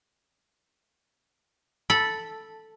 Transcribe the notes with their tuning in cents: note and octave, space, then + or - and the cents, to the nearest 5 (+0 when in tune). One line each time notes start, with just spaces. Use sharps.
A4 +0 B5 -10